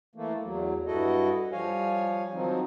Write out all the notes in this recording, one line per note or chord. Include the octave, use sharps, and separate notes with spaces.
E3 A3 A#3
E2 F#3
G2 E4 F#4 A4 D#5
F3 G3 C#5 F5 G#5
D#3 F3 F#3 C4 D#4